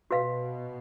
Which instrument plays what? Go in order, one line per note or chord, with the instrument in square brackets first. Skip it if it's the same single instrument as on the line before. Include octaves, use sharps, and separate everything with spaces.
[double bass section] B2 [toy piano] F#4 B4 F5